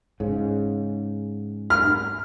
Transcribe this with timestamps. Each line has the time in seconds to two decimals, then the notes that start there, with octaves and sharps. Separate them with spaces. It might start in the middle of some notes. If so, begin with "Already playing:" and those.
0.20 G#2 C#3
1.70 F6